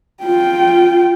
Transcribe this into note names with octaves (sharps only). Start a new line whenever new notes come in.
F4 G5